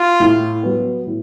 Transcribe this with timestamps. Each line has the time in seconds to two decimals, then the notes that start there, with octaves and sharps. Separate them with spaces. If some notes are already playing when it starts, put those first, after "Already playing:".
Already playing: F4
0.20 A2
0.63 F#3 B3
1.07 A2